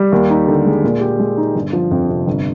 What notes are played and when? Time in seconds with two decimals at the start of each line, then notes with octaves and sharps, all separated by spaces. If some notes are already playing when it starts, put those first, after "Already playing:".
Already playing: G3
0.12 D#2
0.30 D#4
0.48 D3
0.66 G#3
0.84 A#2
1.01 G4
1.20 G#3
1.37 D#4
1.55 G1
1.73 F3
1.91 F2
2.09 C3
2.27 G1